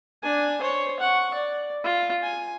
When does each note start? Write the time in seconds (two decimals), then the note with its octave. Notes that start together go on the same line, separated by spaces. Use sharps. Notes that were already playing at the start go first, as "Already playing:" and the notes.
0.23 D4 G#5
0.61 C5 C#5
1.00 F#5 C#6
1.34 D5
1.84 F4
2.23 G#5